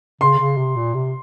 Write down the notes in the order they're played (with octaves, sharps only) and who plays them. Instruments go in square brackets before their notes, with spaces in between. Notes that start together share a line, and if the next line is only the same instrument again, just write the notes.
[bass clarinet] C#3 [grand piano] C6
[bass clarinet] C#3
C3
A#2
C3